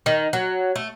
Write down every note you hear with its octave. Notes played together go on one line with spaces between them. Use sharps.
D#3
F#3
A3